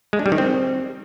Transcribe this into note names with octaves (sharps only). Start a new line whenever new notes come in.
G#3
D4
G3
D#3
C4